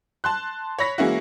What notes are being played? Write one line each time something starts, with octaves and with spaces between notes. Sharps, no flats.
A5 C6 F#6
C#5 B5 A#6 B6
E3 G#3 A#3 C#4 E4 F#4